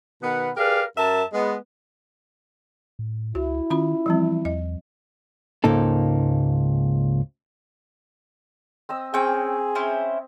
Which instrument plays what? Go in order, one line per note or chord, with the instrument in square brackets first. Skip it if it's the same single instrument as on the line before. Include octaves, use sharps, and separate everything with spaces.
[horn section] B2 D#3 B3 A#4 B4 F#5
G4 G#4 A#4 B4 D5 F5
F#2 A#4 E5 A5
G#3 B3
[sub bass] A2
[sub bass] C#2 [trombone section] E4 [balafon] F#4
[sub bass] D#3 [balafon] C#4 F4 B5
[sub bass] E3 [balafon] F3 G3 C4
[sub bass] E2 [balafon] D#5
[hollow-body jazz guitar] C#2 G#2 A#3 D#4 A4
[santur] C4 D#5 E6
[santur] C4 [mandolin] C#4 G5 [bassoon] G#4
[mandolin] C#4 E4 C5